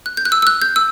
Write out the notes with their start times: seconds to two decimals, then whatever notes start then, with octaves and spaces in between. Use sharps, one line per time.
0.06 F#6
0.17 G6
0.25 F#6
0.32 E6
0.42 E6
0.47 F#6
0.62 G6
0.76 E6